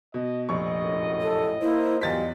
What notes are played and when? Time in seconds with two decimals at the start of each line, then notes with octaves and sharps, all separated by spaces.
0.14 B2 D#5
0.49 F1 A#1 D#5 C#6
0.81 F#2 A2
1.21 A4
1.62 A#3 E4 C5
2.01 E2 F#3 G3 F4 D#5 A6 B6